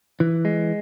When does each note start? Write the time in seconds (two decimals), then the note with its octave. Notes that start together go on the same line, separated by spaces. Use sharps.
0.20 E3
0.45 G#3